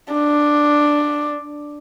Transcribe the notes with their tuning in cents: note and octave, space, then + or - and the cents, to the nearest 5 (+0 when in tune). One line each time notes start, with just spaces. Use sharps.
D4 +5